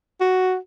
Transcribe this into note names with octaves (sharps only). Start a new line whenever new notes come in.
F#4